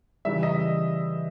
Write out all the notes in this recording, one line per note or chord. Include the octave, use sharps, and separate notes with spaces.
C#3 E3 G3 E5
D#5